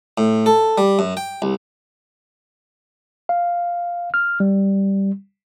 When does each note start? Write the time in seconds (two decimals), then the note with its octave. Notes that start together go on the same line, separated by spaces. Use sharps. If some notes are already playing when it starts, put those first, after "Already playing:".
0.18 A2
0.46 A4
0.78 G3
0.99 F#2
1.17 G5
1.42 C2
3.29 F5
4.14 F6
4.40 G3